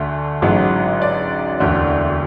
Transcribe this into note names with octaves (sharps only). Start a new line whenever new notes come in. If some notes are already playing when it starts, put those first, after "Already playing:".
Already playing: D2 D3 A3
A1 G#2 F#3
D5
E1 D2 D3